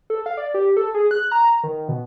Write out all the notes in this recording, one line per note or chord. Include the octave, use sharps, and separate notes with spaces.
A4
F5
D5
G4
A4
G#4
F#6
A#5
D#3
B2